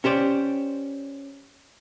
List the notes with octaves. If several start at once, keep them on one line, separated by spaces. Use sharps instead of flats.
C#4 G4 C5 D5